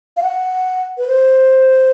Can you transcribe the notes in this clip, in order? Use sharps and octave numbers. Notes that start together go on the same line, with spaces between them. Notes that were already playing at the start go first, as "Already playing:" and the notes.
F5
F#5
B4
C5